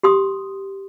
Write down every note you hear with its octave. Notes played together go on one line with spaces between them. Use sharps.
G4 C6 D#6